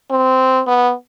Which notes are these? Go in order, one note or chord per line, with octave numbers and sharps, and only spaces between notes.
C4
B3